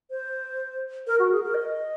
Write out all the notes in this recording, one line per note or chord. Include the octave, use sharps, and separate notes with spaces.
C5
A#4
F#4
G#4
A#4
D#5